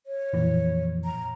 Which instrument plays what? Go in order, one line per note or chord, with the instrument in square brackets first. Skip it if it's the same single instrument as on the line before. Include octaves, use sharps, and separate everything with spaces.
[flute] C#5
[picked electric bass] F2 A#2 E3
[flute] A#5